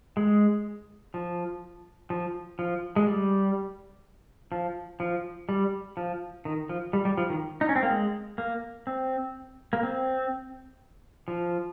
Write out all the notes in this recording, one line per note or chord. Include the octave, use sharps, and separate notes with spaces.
G#3
F3
F3
F3
G#3
G3
F3
F3
G3
F3
D#3
F3
G3
G3
F3
D#3
D#4
C#4
C4
A#3
G#3
A#3
C4
A#3
C4
F3